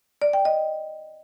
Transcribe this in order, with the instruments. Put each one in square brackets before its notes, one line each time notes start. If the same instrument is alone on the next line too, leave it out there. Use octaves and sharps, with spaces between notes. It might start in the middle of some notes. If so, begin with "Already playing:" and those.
[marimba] D5
G5
D#5